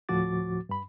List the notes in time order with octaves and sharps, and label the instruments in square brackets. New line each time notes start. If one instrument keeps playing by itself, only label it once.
[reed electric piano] D2 A2 F3 F#4 D6 A6
G2 B5